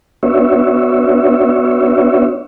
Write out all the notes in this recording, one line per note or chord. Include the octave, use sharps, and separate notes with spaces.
B3 D4 F#4 C#5 E5